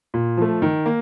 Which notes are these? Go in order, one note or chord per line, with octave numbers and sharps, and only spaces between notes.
A#2
F3 A3
D#3
A#3